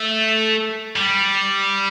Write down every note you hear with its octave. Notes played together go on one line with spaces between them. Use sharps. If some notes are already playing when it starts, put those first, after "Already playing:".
Already playing: A3
G3